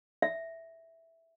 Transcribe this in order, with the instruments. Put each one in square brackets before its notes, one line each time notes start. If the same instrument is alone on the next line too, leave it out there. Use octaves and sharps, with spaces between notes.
[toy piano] E5